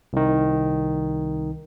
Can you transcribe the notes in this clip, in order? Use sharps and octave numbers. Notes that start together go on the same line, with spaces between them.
C2 D#3